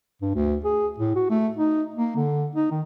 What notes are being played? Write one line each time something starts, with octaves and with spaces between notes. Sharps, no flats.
G2
D2
G#4
A2
F#4
A3
D#4
A#3
D3
D#4
D#3